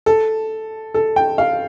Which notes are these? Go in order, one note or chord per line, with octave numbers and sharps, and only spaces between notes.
A4
A4
G5
F5